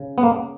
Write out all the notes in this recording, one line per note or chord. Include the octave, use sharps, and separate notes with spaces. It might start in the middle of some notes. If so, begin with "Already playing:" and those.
Already playing: C#3
B3
A#3